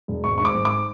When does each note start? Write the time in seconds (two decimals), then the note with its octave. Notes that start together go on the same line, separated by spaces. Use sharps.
0.08 E1
0.24 G#1 C#6
0.38 G#2 C#6
0.45 D6
0.55 G#1
0.65 D6